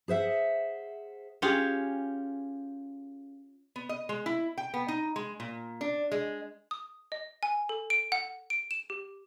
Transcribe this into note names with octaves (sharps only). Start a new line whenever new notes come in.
G#4 C5 E5 F#5
C#4 F4 G4 G#4
B3
D#5
G#3
E4
G5
B3
D#4
G#3
A#2
D4
G#3
D#6
D#5
G#5
A4
D7
F#5
D7
E7
G4